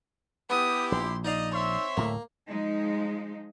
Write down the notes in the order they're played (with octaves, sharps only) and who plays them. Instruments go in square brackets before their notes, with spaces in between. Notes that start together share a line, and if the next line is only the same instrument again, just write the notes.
[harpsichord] B3 [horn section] E4 G4 [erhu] D#6
[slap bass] A#1 [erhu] C6
[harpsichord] D#4 D5 F5 [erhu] D#5
[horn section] C4 C#5 E5 [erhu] C6
[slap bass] D1 A2 A3 [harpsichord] A#3
[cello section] F3 G#3 D#4